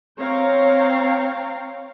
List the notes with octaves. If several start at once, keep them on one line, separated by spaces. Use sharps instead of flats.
C4 C#5 F5 G5 A#5